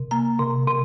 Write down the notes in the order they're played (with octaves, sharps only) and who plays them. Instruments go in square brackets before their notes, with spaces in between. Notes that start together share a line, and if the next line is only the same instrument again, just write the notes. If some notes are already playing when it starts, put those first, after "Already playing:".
Already playing: [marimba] C3
A#3 A#5
C3
C3